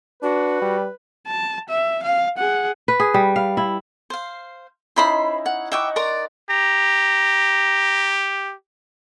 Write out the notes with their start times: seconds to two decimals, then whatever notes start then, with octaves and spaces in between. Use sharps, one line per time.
0.23 D4 F#4 B4
0.62 G3
1.27 A5
1.69 E5
2.03 F5
2.38 G#4 F#5
2.88 B4
3.00 G#4
3.14 G3
3.36 F5
3.57 E4
4.10 C5 F5
4.96 C#4 D#4 E4 C5 B5 C6
5.46 F#5
5.72 D#5 E5 F#5 G5 C#6 D6
5.96 A#4 D5 A#5 C6
6.50 G4 A#5